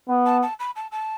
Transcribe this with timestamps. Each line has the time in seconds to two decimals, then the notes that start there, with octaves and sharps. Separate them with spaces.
0.09 B3
0.26 A5
0.42 A5
0.59 B5
0.76 A5
0.91 A5